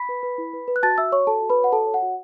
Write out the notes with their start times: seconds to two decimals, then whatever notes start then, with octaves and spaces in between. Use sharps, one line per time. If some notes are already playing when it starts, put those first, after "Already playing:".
Already playing: B5 B6
0.09 B4
0.23 B4
0.38 E4
0.53 B4
0.68 B4
0.76 F#6
0.83 F#4 A5 A6
0.98 F#4 E5 E6
1.12 C#5 C#6
1.27 F#4 A4 A5
1.42 F#4
1.49 B4 B5
1.57 C#5
1.64 F#5
1.72 F#4 A4 A5
1.87 C#5
1.94 F#5
2.02 F#4